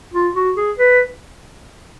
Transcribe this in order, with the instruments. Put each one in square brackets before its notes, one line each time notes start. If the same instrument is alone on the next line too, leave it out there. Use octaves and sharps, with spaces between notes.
[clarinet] F4
F#4
G#4
B4